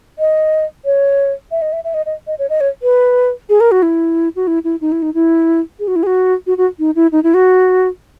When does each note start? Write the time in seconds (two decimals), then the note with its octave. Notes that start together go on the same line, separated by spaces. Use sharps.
0.19 D#5
0.85 C#5
1.51 E5
1.62 D#5
1.73 E5
1.84 E5
1.94 D#5
2.06 D#5
2.27 D#5
2.39 C#5
2.49 D#5
2.60 C#5
2.82 B4
3.49 G#4
3.60 A#4
3.71 F#4
3.82 E4
4.36 F#4
4.47 E4
4.64 E4
4.81 D#4
4.92 E4
5.02 D#4
5.14 E4
5.79 G#4
5.87 F#4
5.96 E4
6.03 G#4
6.06 F#4
6.47 F#4
6.57 F#4
6.79 D#4
6.95 E4
7.12 D#4
7.23 E4
7.34 F#4